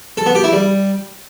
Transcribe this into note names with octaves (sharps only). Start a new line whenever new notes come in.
A4
B3
G4
E4
G3